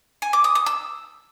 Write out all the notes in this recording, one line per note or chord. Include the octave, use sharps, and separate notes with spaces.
G#5
D6
D#6
D#6
E6